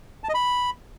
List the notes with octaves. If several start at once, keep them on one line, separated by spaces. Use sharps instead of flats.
A5
D#5
B5